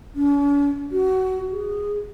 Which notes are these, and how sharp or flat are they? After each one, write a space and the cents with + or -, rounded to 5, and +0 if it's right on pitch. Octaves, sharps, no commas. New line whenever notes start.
C#4 +45
F#4 +20
G#4 -15